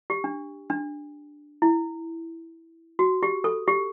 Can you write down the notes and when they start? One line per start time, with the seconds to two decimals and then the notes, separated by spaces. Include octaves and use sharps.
0.10 G4
0.24 D4
0.70 D4
1.62 E4
2.99 F#4
3.23 G4
3.44 A4
3.68 G4